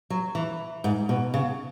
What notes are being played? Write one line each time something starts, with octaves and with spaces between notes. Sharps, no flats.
F#3
E3
G#2
B2
C#3